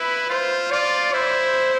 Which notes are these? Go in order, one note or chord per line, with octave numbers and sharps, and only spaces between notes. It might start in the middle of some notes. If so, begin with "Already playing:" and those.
Already playing: E4 B4
F4 C5
F4 D5
E4 C5